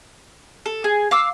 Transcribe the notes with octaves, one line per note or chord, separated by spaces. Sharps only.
A4
G#4
F5 D6 E6